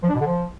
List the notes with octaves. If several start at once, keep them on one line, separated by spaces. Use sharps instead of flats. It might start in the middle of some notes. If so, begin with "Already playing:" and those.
F3
D4
B2
D3
F3